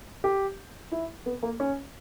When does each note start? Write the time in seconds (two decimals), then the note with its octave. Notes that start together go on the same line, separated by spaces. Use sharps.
0.24 G4
0.92 E4
1.26 B3
1.43 A#3
1.60 C#4